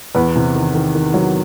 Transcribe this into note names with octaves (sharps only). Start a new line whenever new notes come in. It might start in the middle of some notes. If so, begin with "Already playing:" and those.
E2 B3 B4
C3
D#3
D#3
D#3
F#3